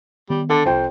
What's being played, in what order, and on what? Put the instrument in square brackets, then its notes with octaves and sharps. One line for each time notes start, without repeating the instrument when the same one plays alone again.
[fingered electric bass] D#3 B3 [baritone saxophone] G3
[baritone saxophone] D3 [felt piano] A4
[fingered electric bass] D1 C2 [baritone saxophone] F2 [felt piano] C5 G5